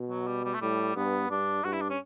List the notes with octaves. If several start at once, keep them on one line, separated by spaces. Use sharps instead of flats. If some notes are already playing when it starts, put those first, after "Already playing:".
Already playing: B2
F#3
G3
G3
A3
A2 G3
G2 B3
G2 D4
G2 F#4
E4
D4
C#4